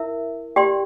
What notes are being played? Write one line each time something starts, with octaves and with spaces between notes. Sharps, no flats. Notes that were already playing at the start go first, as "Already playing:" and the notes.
Already playing: E4 A#4 E5
G4 D5 G5 C6